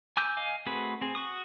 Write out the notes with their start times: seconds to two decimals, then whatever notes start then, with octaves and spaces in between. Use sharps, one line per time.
0.17 G#5 D6 E6 G6
0.37 D#5 F5 G#5
0.66 A3 C4 F#4 G#4 B4
1.01 C4 G#4
1.15 F#4 C#6 D#6